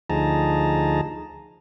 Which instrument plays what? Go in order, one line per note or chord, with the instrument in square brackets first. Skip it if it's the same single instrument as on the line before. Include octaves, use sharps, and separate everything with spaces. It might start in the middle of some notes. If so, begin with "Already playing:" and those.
[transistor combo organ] D2 F3 D#4 G#4 A5 A#5